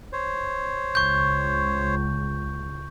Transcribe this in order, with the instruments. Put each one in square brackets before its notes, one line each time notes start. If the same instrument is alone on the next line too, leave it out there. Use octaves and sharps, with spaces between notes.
[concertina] C5 C#5
[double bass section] C#2 [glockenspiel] C#6 G6